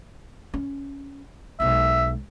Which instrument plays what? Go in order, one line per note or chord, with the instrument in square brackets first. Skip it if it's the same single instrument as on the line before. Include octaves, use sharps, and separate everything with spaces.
[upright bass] C#4
[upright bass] B1 G#3 [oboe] E5